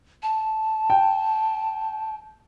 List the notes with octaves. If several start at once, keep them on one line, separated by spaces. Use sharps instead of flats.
A5
G5